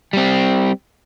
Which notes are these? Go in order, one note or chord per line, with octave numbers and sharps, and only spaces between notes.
G3 C4